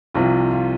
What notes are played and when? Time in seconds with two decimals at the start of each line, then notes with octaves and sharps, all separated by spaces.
0.14 C2 C3 F3 F4
0.51 F4